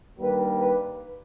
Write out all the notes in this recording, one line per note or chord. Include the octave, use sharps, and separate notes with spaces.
G2 D#3 G3 A#3 B4
B4